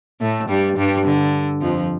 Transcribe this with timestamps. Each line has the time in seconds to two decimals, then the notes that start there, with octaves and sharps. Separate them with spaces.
0.21 A2 A3
0.49 G2 G3
0.77 G2 G3
1.05 D3
1.62 F2 F3